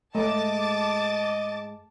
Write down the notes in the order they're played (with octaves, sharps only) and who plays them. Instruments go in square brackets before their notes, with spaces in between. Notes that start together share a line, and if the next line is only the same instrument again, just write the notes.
[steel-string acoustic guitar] G#2 G#3 [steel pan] A3 [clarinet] D#5 [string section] A5 D6 A6